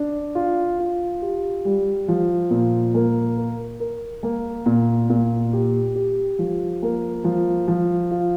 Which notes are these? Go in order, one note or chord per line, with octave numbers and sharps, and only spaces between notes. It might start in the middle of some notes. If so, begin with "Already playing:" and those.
Already playing: D4
F4
F4
G4
G3
F3
A#2
A#3
A#4
A#4
A#3
A#2
A#2
G4
G4
F3
A#3
F3
F3
F4